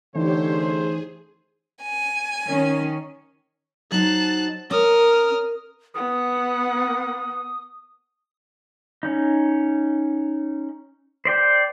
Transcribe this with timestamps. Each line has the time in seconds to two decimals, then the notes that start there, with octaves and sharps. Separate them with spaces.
0.16 D3 E3 A3 C#4 D#4 G4 C5 C#5
0.49 G#4
1.83 G#5
2.46 D#3 C#4
3.92 F#3 D#4 C5 A5 F#6
4.71 C#4 A#4 D#6 F6
5.95 B3 F#5 D#6
9.03 C#4 D#4
11.25 C5 D5 G5